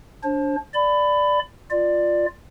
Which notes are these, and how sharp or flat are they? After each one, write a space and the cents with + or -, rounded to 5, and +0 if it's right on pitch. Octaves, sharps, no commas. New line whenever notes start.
D4 -20 C5 +35
D5 +0 B5 +20
F4 +0 D5 +15